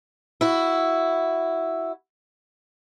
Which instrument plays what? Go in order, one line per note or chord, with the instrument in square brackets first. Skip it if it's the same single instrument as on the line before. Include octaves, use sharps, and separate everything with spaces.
[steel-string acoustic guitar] E4 F#4